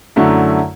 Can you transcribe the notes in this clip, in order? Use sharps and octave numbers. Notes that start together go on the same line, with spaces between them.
F#2 D3 F#3 A3 E4